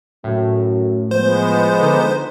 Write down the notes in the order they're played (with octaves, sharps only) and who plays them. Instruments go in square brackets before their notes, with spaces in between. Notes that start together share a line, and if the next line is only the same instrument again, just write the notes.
[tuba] F#2 [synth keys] A2
[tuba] F3 [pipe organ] G#3 B3 [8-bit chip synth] C5
[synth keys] D3 D#4